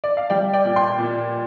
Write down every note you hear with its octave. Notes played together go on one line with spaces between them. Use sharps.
D5
F5
G3 D5 G5
D5 G5
A#2
G5 C6
A#2